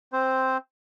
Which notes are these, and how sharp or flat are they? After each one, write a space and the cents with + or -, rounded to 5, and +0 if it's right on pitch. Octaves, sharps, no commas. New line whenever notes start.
C4 +0 C5 -5